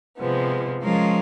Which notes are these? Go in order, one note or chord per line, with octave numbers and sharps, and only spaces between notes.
C3 F3 G#3 B3
F3 G#3 C#4 F4 A#4